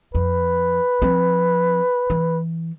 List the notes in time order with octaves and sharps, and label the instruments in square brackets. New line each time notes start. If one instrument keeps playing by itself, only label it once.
[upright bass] F2 [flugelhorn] B4
[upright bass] F3 C4
E3